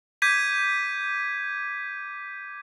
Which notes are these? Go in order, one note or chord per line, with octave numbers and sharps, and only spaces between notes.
D6 G6 G#6 B6 D#7